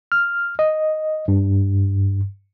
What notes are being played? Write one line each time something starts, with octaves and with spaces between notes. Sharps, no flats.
F6
D#5
G2